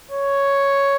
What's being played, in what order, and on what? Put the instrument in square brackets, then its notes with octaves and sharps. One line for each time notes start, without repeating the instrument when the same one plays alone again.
[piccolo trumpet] C#5